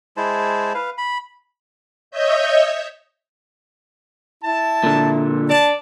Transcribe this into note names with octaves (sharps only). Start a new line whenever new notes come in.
G#3 E4 C5 A5
B4 F5
B5
C#5 D#5 E5 G6
E4 A5
A#2 D3
D4 D5 A5